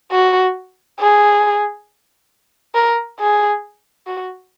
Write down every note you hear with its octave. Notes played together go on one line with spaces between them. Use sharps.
F#4
G#4
A#4
G#4
F#4